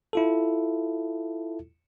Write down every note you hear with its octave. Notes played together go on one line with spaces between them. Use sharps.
E4 F4 A4